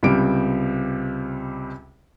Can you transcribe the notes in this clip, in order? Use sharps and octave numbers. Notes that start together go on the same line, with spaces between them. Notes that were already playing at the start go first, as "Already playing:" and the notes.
C#2 C3 G3 D7